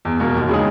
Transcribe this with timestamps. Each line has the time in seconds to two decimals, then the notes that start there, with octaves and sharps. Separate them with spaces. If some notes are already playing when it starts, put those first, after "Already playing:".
0.05 E2
0.20 B2 A#3
0.35 D#2
0.49 C#3 G#3 D#4 G#4